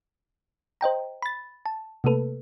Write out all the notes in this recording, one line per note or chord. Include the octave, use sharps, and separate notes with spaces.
C5 D#5 G5 A#5
B5 A6
A5
C3 A3 A#3 A4 B4